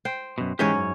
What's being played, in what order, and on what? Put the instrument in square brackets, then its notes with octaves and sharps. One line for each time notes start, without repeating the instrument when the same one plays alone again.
[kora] C5 G5
[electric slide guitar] F#2 B2
[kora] G#2 C#4 C#5 [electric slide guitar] E3 G#3 G4
[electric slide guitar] F#2